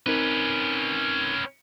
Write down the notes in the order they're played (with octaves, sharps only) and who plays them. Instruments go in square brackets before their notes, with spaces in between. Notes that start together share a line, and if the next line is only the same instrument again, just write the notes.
[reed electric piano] C4 D#4 A#4 [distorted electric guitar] C#4 B4